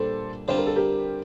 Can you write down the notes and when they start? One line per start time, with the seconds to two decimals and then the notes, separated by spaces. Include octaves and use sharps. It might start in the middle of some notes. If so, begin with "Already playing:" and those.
Already playing: A#2 G3 D4 A4 C5
0.48 D3 G3 C4 F4 C5
0.58 A#4
0.67 A4
0.76 G4 A#4